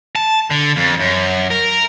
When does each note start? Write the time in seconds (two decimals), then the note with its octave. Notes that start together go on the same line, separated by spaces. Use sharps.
0.15 A5
0.50 D3
0.76 F2
0.99 F#2
1.51 A#4